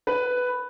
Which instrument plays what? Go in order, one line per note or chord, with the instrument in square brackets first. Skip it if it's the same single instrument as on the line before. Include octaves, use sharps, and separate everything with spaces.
[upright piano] B4